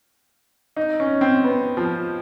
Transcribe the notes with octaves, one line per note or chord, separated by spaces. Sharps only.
D#4
C#4
C4
B3
F3